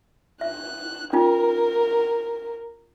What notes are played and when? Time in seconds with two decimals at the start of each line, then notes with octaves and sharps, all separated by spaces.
0.41 E5 F#6
1.13 C#4 D#4 F4 A#4